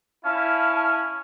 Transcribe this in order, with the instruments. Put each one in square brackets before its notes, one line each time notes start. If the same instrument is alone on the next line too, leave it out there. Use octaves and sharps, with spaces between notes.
[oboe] C#4 [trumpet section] E4 [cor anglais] F5 [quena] A5